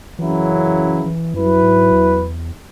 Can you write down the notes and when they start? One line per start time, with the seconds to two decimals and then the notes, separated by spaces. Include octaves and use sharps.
0.19 F#2 C#3 E3 F#3 E4
1.06 E3
1.34 F#2 F#3 E4 B4
1.63 G#2
1.91 E2